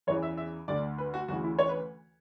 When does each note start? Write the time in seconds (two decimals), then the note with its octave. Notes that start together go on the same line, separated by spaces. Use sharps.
0.07 E2 C#3 E3 C#5
0.23 E5
0.37 E5
0.68 D2 D3 D5
0.98 B4
1.14 F#4
1.28 D2 C#3 E3 F#4
1.43 E4
1.59 C#5
1.69 B4